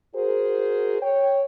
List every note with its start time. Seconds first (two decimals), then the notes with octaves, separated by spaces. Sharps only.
0.15 F#4 G#4 A#4 C5
1.02 C#5 G5